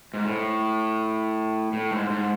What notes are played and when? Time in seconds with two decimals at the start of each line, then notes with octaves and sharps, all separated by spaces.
0.14 G#2
0.25 A2
1.73 A2
1.91 G#2
2.10 G#2